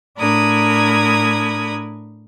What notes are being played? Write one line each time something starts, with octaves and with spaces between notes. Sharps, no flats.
A2 D4 A#4 B5 D#6 G#6